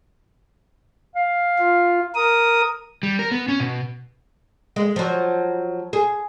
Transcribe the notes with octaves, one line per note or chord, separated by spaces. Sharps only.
F5
F4
A#4 D#6
G3
A#4
B3
C#4
B2
G#3
F3 F#3
G#4